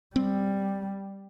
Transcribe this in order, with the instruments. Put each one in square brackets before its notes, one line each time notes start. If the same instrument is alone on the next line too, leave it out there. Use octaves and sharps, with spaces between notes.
[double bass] G3 [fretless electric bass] C4